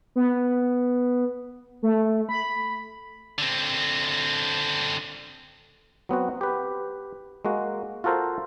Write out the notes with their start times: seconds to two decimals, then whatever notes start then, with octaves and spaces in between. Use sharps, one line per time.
0.16 B3
1.83 A3
2.29 B5
3.38 D3 C4
6.09 F#3 B3 C4 F#4
6.41 G4 B4
7.45 G#3 A#3 F#4
8.04 F4 F#4 A4 A#4 C5